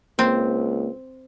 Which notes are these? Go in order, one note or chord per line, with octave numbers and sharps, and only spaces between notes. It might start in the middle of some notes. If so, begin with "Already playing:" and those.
C#2 A#3 C4